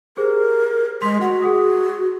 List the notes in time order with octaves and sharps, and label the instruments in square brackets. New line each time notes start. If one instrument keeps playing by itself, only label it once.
[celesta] G4 G#4 C5 [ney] A#4
[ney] G#3 [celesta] C6 B6
[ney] F#4 [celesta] F#5 C6
[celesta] G#4 F#5 D#6